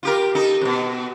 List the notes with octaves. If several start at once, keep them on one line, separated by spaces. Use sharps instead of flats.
F4 G4 A#4
D#4 A4
F2 B2